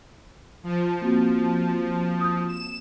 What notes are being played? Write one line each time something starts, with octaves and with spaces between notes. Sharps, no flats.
F3
A#3 C4 F#4
D#6 G6
E7